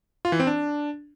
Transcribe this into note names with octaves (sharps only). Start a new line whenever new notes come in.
F4
E3
C4
D4